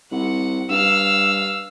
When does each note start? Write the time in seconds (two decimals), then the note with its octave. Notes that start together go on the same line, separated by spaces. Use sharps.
0.12 C2 F#5
0.70 G2 F5 E6